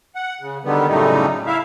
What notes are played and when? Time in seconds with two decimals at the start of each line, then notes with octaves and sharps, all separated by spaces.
0.15 F#5
0.41 C#3
0.64 D3 D#3 G3 B3
0.88 F#2 A2 C#3 G3 A3 D#4
1.47 E4 E5 F5